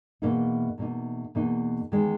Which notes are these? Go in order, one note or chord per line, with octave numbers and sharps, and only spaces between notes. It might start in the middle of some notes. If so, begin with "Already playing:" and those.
E2 B2 A#3 D#4
E2 B2 A#3 D#4
E2 B2 A#3 D#4
E2 D#3 G#3